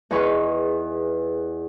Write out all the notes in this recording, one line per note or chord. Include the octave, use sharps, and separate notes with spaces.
E2 D#4 G#4 B4 C#6 F6